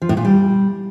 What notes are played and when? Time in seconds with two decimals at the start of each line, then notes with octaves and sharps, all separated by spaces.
0.02 F3
0.09 A2
0.17 A#2
0.25 G3